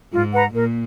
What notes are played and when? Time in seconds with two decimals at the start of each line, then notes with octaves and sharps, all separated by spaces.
0.12 G#2 F4
0.33 B4 F#5 A#5
0.54 A#2 A#4